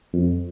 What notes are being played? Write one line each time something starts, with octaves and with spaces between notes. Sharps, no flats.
F2